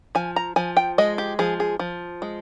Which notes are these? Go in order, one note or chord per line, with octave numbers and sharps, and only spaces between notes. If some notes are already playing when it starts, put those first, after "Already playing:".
F3 G#5
A#5
F3 G#5
G5
G#3 D#5
G4
F3 G#4
G#4
F3
G#3